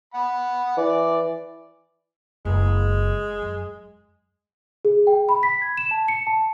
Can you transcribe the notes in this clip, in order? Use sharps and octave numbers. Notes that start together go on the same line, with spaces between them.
F#5 B5
E3 D5
F#1 G#3
F#2
G#4
G5
B5
B6
G#6
E7
A5
C#7
A5